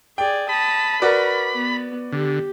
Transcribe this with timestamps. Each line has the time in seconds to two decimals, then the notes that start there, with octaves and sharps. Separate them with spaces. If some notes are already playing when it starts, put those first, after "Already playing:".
0.18 G#4 D5 G5
0.49 A5 B5 D#6
1.02 F#4 A#4 B4 D5
1.54 B3
2.12 D3 G4